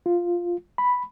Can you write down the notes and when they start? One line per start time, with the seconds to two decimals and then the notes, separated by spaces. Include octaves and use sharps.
0.06 F4
0.78 B5